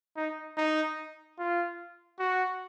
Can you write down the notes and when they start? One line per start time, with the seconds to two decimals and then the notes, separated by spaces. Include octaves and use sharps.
0.16 D#4
0.57 D#4
1.39 F4
2.19 F#4